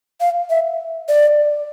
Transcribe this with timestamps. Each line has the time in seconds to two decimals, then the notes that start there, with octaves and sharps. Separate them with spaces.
0.21 F5
0.50 E5
1.09 D5